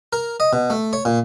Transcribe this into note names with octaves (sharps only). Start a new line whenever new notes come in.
A#4
D#5
B2
A3
C#5
A#2